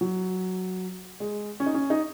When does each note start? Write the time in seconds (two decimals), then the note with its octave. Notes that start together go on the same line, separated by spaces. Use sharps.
0.01 F#3
1.20 G#3
1.60 C#4
1.66 D#4
1.74 C#4
1.90 D#4